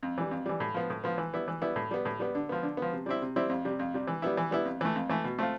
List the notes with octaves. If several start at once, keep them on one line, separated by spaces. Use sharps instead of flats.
F2
E3 G3
F2
E3 G3
A2
F3 B3
A2
F3 B3
E3
G3 B3 E4
E3
G3 B3 E4
A2
G3 B3
A2
G3 B3
D3
F3 B3
D3
F3 B3
C3
G3 C4 E4
C3
G3 C4 E4
F2
C3 G3
F2
C3 G3
E3
G3 B3 E4
E3
G3 B3 E4
F2
E3 A3
F2
E3 A3
B2
A3 C4 F4